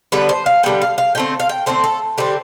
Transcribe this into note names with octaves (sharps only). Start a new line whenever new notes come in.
D3 G3 B3 B4
C5
F5
D3 G3 B3 G5
F5
F5
D3 A3 C4 G5
F5
G5
D3 A3 C4 C5
A4
D3 G3 C4 G4